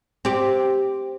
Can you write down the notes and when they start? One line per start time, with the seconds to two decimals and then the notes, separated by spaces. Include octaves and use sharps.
0.25 C4 G4